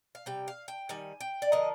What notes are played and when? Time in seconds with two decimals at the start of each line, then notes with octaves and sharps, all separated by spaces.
0.15 F5
0.26 C3 G3 G5
0.48 F5
0.68 G5
0.89 D#3 G3 G#5
1.21 G5
1.42 D5
1.52 D3 F3 A#3 D#5